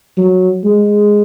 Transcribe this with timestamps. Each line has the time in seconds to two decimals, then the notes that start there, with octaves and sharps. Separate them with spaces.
0.17 F#3
0.65 G#3